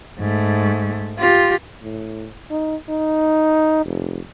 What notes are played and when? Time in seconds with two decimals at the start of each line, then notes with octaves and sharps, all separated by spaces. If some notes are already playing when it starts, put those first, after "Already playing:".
0.19 G#2 A3
1.18 F4 G4
1.83 A2
2.50 D#4
2.89 D#4
3.85 F1